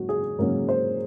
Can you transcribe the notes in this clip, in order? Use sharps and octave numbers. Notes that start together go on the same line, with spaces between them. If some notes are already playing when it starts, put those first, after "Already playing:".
Already playing: G#2 F#3 A#3 C#4 F#4
G#4
G#2 F#3 A#3 C#4 A#4
C5